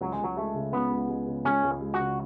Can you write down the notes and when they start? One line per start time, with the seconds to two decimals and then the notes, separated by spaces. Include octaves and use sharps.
0.01 C#2 F#3
0.12 G#3
0.19 C#2 F#3
0.37 G#3 A3
0.54 C#3
0.72 C#2 B3
0.91 C#2
1.09 G#3
1.27 C#3
1.45 C#2 C#4
1.63 C#2
1.81 G#3
1.94 F#4
2.00 C#3